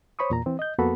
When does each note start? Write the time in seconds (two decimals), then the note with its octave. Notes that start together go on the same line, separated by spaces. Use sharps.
0.19 C5 C#5 B5 C#6 D#6
0.30 E2 A#2 A#5
0.46 E3 C4
0.59 D#5 G6
0.79 F2 A#3 B3 F#4 A4 B5